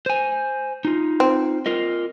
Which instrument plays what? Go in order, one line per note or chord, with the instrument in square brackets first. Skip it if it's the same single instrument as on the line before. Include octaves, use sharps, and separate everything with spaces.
[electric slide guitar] C5 G#5
D#4 F4
[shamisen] C4
[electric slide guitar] F4 A#4 D#5